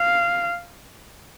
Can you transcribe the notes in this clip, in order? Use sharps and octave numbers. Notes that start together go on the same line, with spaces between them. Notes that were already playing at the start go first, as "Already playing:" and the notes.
Already playing: F5